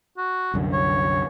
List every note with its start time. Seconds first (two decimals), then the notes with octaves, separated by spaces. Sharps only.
0.17 F#4
0.54 C2 F#2 D3
0.73 C#5